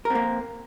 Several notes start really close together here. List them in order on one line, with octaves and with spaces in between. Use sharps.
A#4 C4 A#3